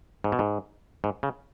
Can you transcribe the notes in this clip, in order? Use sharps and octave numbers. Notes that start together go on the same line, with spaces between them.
G#2
B2
G#2
G#2
C#3